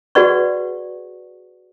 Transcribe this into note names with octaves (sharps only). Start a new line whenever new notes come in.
F#4 G#4 B4 D5 F#5 C#6